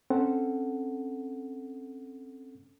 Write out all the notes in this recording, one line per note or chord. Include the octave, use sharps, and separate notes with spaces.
C4 C#4 A4 F#5